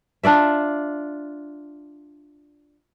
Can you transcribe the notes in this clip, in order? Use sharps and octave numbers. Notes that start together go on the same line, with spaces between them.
D4 F4 D5 E5